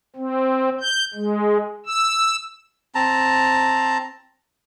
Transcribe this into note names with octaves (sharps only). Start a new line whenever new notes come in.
C4
G6
G#3
E6
C4 A5 A#5